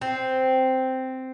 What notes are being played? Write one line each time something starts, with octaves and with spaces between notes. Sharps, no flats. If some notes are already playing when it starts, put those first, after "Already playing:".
C4